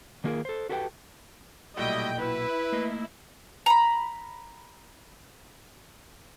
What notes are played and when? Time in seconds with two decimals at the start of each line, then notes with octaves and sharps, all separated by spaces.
0.24 D#3 A#3 F4 G#4 A#4
0.45 A4 C5
0.69 F#4 G4 A4 B4 E5 G5
1.77 B1 A#2 G3 A3 E4 F#4 D#5 G5
2.19 E4 B4
2.72 A3 A#3 D#5
3.66 A#5 B5